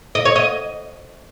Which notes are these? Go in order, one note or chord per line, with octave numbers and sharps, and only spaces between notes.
D#5
C#5
D#5